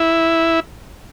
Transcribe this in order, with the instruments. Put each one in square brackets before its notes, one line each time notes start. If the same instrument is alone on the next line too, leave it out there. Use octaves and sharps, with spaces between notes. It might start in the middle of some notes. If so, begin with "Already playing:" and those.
Already playing: [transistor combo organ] E4